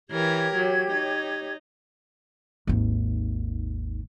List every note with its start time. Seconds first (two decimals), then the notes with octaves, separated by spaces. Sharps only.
0.10 E3 G4 A#4 C#5 G#6
0.55 F#3
0.92 D#4
2.67 G#1 D#2